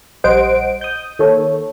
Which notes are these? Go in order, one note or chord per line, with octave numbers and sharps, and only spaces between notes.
A#1 G3 C5 D#5 F#5 D7
D#6 G6
D#3 A#3 A4 C#5